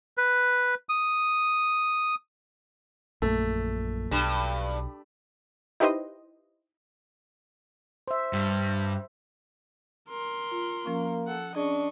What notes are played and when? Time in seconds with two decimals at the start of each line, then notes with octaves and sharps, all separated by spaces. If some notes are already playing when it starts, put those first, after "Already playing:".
0.17 B4
0.89 D#6
3.22 A#1 F#2 A3 A#3
4.11 B1 G2
5.80 D#4 E4 G4 B4 C5 D#5
8.08 C5 E5
8.33 G2
10.09 A#4 C6
10.52 F4
10.86 F3 A#3 C#4 C#6
11.27 A4 F#5
11.56 C#4 D4 G#4 D#5 C#6